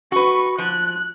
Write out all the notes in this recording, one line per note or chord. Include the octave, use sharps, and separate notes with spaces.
F#4 B4 C#6
F3 F#6